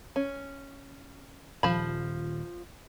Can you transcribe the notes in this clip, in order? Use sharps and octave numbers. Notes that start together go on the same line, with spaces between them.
C#4
D#1 F3 B5